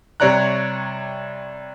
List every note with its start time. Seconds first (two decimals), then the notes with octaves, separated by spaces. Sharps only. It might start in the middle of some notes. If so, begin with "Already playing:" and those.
0.20 C3 G3 C#5 D5 A#5 F#6